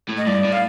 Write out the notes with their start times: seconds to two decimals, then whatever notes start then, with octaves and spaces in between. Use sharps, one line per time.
0.09 A2
0.17 D#5
0.27 G2 D5
0.45 A2
0.52 F5